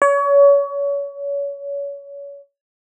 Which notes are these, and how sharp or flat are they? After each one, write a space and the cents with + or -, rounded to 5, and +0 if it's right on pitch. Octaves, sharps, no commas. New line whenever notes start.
C#5 +30